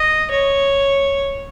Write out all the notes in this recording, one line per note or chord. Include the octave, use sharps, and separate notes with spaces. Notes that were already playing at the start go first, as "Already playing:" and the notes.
Already playing: D#5
C#5